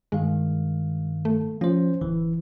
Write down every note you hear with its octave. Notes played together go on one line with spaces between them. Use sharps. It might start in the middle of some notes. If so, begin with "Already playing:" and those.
G2 D#3 G#3 F5
A3
F3 C#4 C5
D1 E3